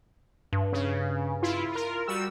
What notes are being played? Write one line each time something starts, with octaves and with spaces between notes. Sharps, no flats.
G2
C#3
E4 F4
F4 A#4
G3 F#4 E6